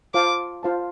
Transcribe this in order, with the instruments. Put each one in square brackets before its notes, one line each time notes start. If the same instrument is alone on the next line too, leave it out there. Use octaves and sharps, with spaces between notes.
[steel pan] F4 C5 F5 A5 [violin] D6
[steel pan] F4 C5 F5 A5